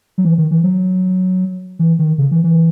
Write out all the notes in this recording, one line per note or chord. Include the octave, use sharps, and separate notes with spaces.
F#3
E3
D#3
E3
F#3
E3
D#3
C#3
E3
E3